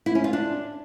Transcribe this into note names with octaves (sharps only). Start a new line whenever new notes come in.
E4
C#4
F4
D4